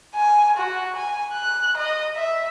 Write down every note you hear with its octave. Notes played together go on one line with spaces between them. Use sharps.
G#5
F#4
G#5
F#6
D#5
E5